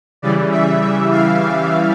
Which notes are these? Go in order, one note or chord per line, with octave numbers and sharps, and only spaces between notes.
C#3 E3 G3 D5
E5
E5
F5